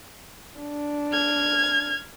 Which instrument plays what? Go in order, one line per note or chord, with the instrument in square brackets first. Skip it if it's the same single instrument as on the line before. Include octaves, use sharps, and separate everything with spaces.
[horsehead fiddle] D4
[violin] F6 G#6